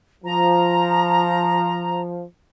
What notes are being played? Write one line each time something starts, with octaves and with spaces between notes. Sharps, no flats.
F3 A#5